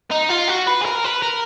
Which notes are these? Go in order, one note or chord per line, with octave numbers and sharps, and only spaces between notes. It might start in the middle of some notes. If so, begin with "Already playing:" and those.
D#4
F4
F#4
B4
G#4
A#4
B4
A#4